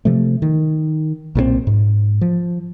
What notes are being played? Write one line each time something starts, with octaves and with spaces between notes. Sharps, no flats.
C3 F3 A3
D#3
B1 A#2 G3 C4
G#2
F3